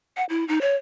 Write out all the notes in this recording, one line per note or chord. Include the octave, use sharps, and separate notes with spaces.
F#5
E4
D#4
C#5